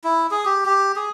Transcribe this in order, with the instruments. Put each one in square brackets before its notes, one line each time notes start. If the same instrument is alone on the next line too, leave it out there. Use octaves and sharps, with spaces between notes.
[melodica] E4
G#4
G4
G4
G#4